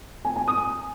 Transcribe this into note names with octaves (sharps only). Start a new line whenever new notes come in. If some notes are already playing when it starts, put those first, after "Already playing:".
G#5
G#5
D#6